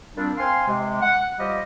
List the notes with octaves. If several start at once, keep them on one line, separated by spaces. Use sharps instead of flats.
A#2 G3 C4 D4
C4 F5 G#5 C6
C3 G#3
F#5
F3 G3 G4 D#5